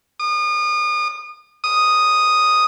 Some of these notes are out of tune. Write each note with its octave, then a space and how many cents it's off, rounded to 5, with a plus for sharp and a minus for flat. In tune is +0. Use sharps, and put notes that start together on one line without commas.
D#6 -35
D#6 +0